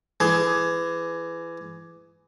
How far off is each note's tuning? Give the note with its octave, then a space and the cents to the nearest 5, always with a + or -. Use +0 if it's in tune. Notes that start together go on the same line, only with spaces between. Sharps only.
E3 +25 G#4 +15